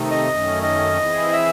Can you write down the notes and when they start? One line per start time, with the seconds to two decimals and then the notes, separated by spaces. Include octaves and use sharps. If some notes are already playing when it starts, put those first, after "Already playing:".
Already playing: C3 D#3 A3 D#4
0.11 D#5
0.29 F#2 D#3 A3 C#4
0.63 D#5
0.98 E3 C4 E4 G#4
1.32 E5